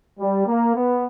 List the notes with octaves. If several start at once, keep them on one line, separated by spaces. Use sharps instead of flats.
G3
A#3
B3